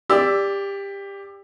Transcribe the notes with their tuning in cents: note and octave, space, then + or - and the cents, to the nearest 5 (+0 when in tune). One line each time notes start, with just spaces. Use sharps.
G4 +20 D5 -5 E6 +10